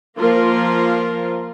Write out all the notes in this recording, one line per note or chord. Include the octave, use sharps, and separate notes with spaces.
F3 A#3 F4 A#4